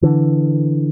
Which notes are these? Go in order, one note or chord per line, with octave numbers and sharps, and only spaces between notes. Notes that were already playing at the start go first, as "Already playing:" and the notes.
D3 E3